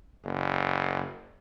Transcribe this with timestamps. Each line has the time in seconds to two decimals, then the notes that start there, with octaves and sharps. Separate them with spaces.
0.24 F#1